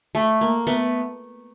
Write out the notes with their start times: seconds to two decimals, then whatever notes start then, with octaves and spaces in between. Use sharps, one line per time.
0.15 A3
0.41 A#3
0.67 A3 B3